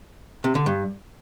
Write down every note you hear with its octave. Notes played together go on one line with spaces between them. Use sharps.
C3
D3
G2